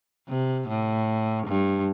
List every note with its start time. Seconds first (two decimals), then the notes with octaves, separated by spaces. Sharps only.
0.28 C3
0.68 A2
1.47 G2